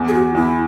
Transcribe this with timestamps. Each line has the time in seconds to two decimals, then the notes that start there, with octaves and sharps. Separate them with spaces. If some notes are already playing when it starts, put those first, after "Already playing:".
Already playing: E2
0.08 G#4
0.14 E2 F#4
0.35 E2 E4